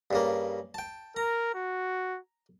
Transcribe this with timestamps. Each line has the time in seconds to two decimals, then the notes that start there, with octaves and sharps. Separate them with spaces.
0.11 G2 C#3 A#3
0.74 G5 A5
1.16 A#4 A#5
1.55 F#4